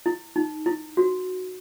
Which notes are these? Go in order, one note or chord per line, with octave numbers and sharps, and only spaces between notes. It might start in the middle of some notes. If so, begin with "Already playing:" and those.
E4
D#4
E4
F#4